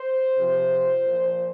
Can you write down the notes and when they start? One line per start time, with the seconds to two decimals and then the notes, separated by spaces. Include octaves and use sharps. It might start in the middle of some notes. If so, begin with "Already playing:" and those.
Already playing: C5
0.37 C3 F3
1.03 A#2 F3